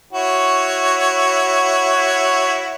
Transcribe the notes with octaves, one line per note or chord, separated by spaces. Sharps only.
E4 F#4 C#5